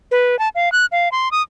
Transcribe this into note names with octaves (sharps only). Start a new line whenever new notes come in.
B4
A5
F5
F#6
F5
C6
D#6